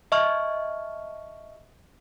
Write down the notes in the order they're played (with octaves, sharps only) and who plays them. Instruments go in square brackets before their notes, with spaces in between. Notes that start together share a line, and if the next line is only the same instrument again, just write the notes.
[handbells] D#5 E5 A5 C#6 F6